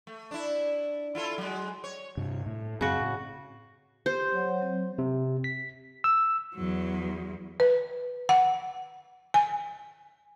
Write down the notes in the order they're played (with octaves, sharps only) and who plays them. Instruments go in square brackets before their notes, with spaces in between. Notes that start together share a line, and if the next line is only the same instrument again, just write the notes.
[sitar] A3
D4 E4
E4 F4 A4
F#3 G#3
C#5
[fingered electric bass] G2 C3
A2
[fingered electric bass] F#2 C4 [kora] C#3 F#4
[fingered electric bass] A2
[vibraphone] G4 [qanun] C5
[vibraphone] F#3 C#5 F#5
F#3 C4
[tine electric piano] C3
B6
E6
[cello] E2 F#3
[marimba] B4
F#5
G#5